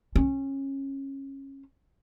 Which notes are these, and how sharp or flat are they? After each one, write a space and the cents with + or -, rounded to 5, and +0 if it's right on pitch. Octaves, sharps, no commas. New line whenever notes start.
C#4 -25